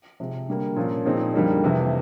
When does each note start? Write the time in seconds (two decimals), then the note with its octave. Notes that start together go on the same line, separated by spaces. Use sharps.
0.20 C3 F3 G#3
0.48 D3 G3 A#3
0.76 A#2 F3 A#3 C#4 F4
1.05 A#2 F3 G#3 C4 D#4
1.34 F2 D3 G3 A#3 D#4
1.64 F2 C3 E3